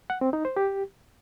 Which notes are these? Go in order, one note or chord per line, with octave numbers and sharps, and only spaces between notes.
F#5
C4
D#4
C5
G4